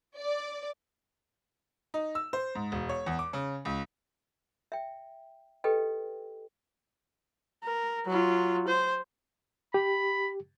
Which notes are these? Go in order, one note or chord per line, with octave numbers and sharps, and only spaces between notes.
D5
D#4
E6
C5
G#2
E1
C#5
E2
D6
C#3
C#2
E5 G5
G4 A4 B4 D#5 G5
A#4
F#3 F4
C5
G4 B5